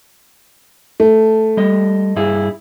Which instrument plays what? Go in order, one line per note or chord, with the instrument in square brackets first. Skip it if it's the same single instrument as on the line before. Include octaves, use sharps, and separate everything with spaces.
[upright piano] A3
[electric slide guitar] G3 D#5
G2 E4 G#4